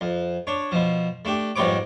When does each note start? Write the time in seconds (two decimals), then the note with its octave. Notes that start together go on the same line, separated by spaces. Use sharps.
0.01 F2
0.47 D4 C#5
0.72 B2 F3
1.25 A3 D4 G4
1.56 F2 G#2 G3 B3 C#5 D6